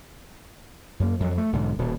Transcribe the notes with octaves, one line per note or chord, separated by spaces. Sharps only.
F#2 A#3
F2 F#3
A3
B1 G#2 D3
D#1 B2